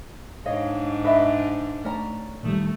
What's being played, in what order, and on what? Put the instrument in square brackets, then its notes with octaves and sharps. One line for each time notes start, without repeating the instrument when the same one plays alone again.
[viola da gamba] G#2 D4 [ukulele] C#5 D#5 F5
[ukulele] B4 D#5 E5
[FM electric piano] A3 [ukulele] C#4 D5 A#5
[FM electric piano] A#2 D#3 G3 [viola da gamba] A3